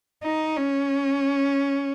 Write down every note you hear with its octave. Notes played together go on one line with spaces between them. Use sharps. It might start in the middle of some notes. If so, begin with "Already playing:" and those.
D#4
C#4